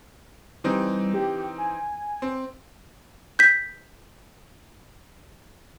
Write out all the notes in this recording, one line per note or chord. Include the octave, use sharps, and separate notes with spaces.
E3 G3 C4 D#4
G4
G#5
C4
G6 B6